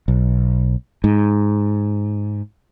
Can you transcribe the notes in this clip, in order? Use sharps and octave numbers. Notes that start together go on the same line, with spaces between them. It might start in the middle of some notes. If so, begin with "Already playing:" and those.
B1
G#2